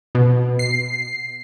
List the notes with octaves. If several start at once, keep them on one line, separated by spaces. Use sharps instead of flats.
B2
C7